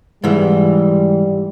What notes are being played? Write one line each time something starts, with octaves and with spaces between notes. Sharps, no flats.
G#2 E3 G3